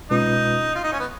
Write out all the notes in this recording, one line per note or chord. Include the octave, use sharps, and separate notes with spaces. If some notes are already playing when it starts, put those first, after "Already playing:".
B2 G#3 C#4 D#4 F4 B4
F4
D#4
C#4
B3